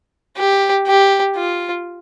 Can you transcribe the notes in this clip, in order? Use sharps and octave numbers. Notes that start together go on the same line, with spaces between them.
G4
G4
F4